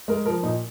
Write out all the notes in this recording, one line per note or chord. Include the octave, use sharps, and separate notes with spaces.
G#3 A#4
F3 A#4
A#2 D#4